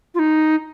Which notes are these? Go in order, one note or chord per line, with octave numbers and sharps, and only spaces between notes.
F4
D#4